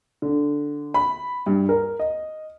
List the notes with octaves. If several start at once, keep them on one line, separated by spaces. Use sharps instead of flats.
D3
B5
G2
A#4
D#5